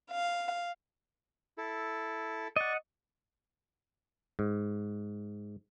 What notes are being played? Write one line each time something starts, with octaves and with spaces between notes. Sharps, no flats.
F5
E4 A4
D5 D#5 F#5 C#6
G#2